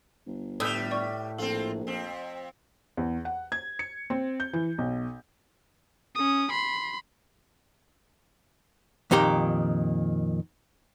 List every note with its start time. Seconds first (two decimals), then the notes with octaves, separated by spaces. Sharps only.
0.27 G1
0.60 A2 G3 B4 D#6 E6 G6
0.91 D5 C#6
1.38 A#1 C4 F4 A4
1.87 F2 C4
2.97 E2
3.25 F#5
3.52 G#6
3.79 C#7
4.10 C4
4.40 G6
4.53 E3
4.78 B1
6.15 C#4 D#6
6.51 B5 C6
9.11 F2 A#2 D#3 G4 A#5